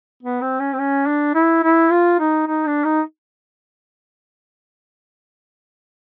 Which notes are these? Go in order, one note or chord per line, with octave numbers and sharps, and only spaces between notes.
B3
C4
C#4
C4
C#4
D4
E4
E4
F4
D#4
D#4
D4
D#4